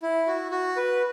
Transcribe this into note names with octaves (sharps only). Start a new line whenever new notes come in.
E4
F#4
F#4
B4